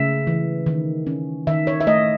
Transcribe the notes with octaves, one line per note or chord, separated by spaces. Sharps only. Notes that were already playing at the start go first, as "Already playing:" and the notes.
Already playing: C#3 A3 E5
E3
D#3
C#4
D#3 E5
C#5
E5
A3 D#5